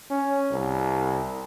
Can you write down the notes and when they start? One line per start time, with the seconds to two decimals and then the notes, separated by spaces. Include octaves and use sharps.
0.10 C#4
0.51 C2